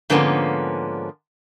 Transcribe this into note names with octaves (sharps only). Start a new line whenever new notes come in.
G#2 D3 F3 A#3 B3 C#4